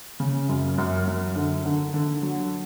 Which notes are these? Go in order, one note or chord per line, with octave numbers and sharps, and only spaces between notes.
C#3
F#2
F#2
F#2
D3
D3
D3
F#3